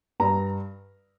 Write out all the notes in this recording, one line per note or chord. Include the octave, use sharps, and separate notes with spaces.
G2 A#5